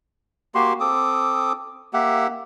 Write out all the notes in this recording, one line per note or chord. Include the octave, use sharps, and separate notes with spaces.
A#3 F#4 G4 C6
C4 A4 D6 D#6
A#3 G4 E5 F#5